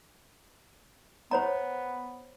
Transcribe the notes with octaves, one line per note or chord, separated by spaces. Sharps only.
B3 C5 C#5 A#5